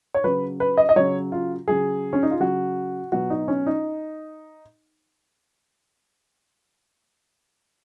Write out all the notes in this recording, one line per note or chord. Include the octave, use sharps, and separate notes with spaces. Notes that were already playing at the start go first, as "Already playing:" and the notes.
C#5
C#3 F#3 B4
B4
D#5
D#5
C#3 F#3 C#5
F4
C#3 F#3 G#4
C#4
D#4
F4
C#3 F#3 F#4
B2 F#3 F#4
D#4
C#4
D#4